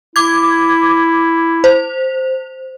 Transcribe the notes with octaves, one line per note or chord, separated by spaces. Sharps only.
E4 D6 G#6
C5